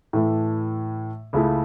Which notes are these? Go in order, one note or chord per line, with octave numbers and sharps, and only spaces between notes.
A2 E3 A3 E4
C#2 C#3 A3 E4